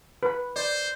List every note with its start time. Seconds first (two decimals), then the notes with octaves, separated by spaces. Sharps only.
0.23 B4 B5
0.56 C5 D5